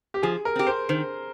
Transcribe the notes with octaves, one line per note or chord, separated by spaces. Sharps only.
G4
F3 G#4
A#4
C4 G4
C5
D#3 C5